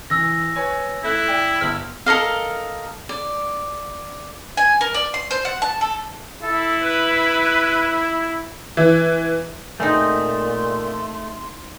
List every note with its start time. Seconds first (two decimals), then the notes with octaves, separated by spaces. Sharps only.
0.10 E3 E6 A#6
0.56 B4 C#5 G#5
1.04 A3 E4 E5 F#6
1.27 D5 G5
1.61 G1 F6
2.06 A4 A#4 D#5 F5
3.09 D5
4.57 G#5
4.81 A#4
4.94 D5
5.14 C6
5.31 C5
5.45 F#5
5.62 A5
5.81 A4
6.42 E4 A4
6.82 B4
8.77 E3
9.80 A#2 G#3 A3 C4 D#4 C6